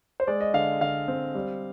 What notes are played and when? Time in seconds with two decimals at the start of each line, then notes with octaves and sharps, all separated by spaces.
0.20 C5
0.28 G#3 D5
0.41 D#5
0.54 D3 F5
0.81 D3 F5
1.08 C4
1.35 G3